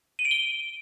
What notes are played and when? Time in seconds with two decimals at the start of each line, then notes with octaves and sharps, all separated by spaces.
0.19 D#7
0.25 D7
0.31 G7